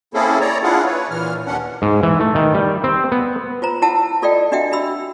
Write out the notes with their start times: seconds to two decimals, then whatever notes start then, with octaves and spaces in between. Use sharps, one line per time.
0.14 A#3 C4 C#4 E4 G#4 A4
0.41 C#5 D5 A#5
0.63 D4 E4 F4 G#4 F#5
0.85 B4 C#5
1.11 A#2 E3 F6
1.47 D#2 C#4 D4 F#5
1.82 G#2
2.03 E3
2.20 A3
2.35 D#3
2.54 G3
2.84 C4
3.12 B3
3.62 F4 C5 A#5
3.82 E4 F4 F#5 A5 E6
4.22 F4 A4 D5 D#5 F5 G5
4.52 D4 F#4 D#5 E5 F#5 G5
4.72 D4 F#4 B5 E6